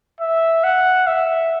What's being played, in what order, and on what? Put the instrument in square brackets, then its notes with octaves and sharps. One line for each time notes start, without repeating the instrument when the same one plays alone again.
[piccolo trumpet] E5
F#5
E5